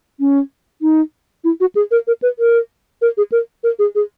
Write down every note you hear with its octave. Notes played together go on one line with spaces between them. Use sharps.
C#4
D#4
E4
F#4
G#4
A#4
A#4
B4
A#4
A#4
G#4
A#4
A#4
G#4
G#4